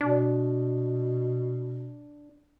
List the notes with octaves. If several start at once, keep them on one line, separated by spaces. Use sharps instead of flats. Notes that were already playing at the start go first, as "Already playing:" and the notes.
B2 D4